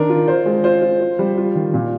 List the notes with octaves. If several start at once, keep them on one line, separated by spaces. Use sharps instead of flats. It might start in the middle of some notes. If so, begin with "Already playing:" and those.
Already playing: D#3 D4 A#4
F4
F4 C5
G#3
F4 C5
F4
F4
G3
F4
D#3
A#2